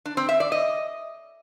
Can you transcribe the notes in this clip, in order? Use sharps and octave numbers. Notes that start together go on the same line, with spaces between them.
D4
C4
E5
D5
D#5